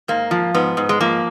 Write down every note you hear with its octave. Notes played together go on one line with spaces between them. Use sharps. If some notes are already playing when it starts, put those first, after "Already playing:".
G#2 A#3
F3
G#2 B3
G#2
G#3
F3 A#3